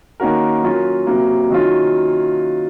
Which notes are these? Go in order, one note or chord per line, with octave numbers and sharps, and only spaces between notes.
D#3 A#3 C#4 F#4 A#4
F#3 C#4 F4 A#4
C3 F#3 A#3
D#3 F#3 C#4 F4